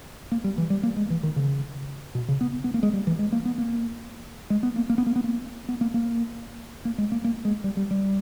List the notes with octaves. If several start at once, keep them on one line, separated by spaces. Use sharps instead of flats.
A#3
G3
E3
G3
A#3
G#3
E3
D#3
C#3
B2
C#3
B3
B3
A#3
G#3
G3
E3
G#3
A#3
B3
A#3
G#3
B3
A#3
A#3
B3
A#3
B3
A#3
B3
A#3
A#3
A#3
G#3
A#3
A#3
G#3
G3
G3
G3